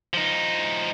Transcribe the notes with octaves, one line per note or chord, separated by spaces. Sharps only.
F3 D#4